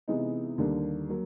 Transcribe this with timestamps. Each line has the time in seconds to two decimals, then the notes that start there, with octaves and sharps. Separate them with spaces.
0.08 C3 E3 G#3 B3 D#4
0.58 D#2 D3 G3 A#3 D4
1.08 F#3 A#3